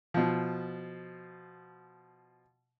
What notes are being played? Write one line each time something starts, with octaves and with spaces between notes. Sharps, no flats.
B2 F3